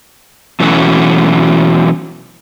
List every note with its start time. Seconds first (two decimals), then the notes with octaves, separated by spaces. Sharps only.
0.60 B2 E3 F#3 A3 C#4 F#4